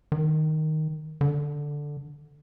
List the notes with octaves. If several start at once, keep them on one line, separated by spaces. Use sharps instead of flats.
D#3
D3